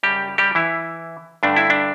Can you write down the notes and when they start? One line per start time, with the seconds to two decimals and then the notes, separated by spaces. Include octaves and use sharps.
0.03 F#2 C#3 G3 G4
0.38 G3 G4
0.55 E3 E4
1.43 G2 D3 A3 D4
1.56 E4
1.70 D4